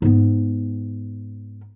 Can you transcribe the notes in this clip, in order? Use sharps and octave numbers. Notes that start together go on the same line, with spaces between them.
G#2 B3